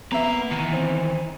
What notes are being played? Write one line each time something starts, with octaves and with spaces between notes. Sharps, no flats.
A#3 B3 E5 A#5
D#3 E3
C4